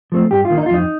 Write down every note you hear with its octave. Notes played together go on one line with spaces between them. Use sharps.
F3 A3 C4
G2 G4
F4
D#3 A#3
D#4
F4
F2 D#4